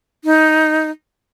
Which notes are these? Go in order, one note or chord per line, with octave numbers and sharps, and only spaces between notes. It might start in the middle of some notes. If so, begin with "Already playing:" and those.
D#4